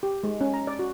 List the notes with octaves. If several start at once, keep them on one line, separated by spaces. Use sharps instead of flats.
G4
G#3
C#4
A#5
D5
F#4